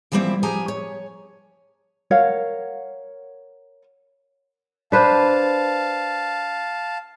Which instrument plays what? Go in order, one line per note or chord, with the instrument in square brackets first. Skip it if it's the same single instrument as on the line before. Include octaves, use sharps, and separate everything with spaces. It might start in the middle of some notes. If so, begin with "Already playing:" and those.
[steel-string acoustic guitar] E3 F3 G3 A#3 C4 E4
F3 G4 G#4 G#5 A#5
C#5
[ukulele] A#4 C#5 F5 F#5
[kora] D4 B4 C5 [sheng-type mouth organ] F5 A5